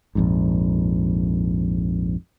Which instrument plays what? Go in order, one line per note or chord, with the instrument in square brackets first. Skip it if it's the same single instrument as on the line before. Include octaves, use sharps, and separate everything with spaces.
[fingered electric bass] A#1 F2 G#2